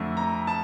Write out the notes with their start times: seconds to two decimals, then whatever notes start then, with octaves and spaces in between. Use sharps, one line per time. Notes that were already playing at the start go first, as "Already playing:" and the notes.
Already playing: F2 D3 A3
0.17 A#5
0.47 A5